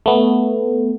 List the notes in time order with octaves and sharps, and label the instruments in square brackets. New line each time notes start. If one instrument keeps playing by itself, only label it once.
[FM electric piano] A3 B3